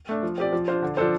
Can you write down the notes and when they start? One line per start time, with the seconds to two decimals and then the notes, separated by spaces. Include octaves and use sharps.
0.09 A3 D4
0.23 F3
0.38 C4 G4 D5
0.53 F3
0.68 D4 F4 C5
0.82 D3
0.97 F3 D4 A4 C5